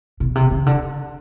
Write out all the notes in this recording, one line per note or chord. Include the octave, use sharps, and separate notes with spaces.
B2
C3
C#3
D3